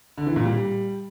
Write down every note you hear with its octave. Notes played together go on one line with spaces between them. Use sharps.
D3
E3
A#2
G3